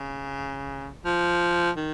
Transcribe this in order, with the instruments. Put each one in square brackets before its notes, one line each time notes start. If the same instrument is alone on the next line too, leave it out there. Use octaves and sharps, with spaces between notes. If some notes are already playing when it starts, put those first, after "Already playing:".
Already playing: [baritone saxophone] C#3
F3
D#3